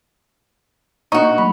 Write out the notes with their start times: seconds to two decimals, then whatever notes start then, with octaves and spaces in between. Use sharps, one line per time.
1.12 A#2 A#3 D4 D#4 F#4 C#6
1.38 F#3 A3 B5